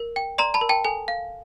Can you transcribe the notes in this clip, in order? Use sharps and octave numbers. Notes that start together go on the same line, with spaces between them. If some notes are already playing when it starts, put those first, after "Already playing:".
Already playing: A#4
G5
D5 A#5 C6
A5 B5
A#4
G5 A5
A4 G#5
F5